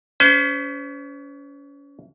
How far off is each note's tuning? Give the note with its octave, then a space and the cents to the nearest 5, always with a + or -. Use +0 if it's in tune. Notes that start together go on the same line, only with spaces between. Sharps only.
C#4 +35 C5 -35